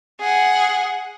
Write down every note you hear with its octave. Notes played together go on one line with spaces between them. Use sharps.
G#4 F#5